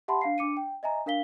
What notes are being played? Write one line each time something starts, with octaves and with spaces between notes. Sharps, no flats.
G4 E5 F#5 A5 B5 C6
D4 F5 C7
D4 D6 C#7 D#7
G5
D#5 E5 G#5 A#5
D4 A#4 F5 B6 G7